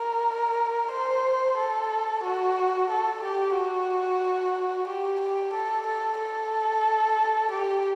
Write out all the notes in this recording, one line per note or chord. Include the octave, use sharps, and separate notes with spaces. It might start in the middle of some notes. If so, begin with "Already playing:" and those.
Already playing: A#4
C5
A4
F#4
A4
G4
F#4
G4
G4
A4
A4
A4
G4